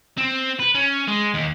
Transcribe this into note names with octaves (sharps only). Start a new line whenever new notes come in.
C4
B4
C#4
G#3
D#2